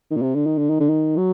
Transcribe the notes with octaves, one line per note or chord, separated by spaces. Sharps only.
D#3
A#2
C3
D3
D#3
D3
D#3
D3
D#3
F#3